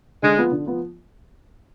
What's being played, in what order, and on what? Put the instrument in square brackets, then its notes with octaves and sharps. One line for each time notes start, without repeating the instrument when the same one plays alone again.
[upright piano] D3 [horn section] G#3
[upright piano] F3 B3 F4
D3
F3 B3 F4